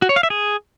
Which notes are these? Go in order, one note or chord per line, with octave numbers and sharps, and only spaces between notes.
F#4
C#5
F5
E5
G#4